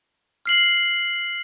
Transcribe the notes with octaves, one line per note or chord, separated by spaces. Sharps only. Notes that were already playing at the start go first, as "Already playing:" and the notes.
F6 C7 F#7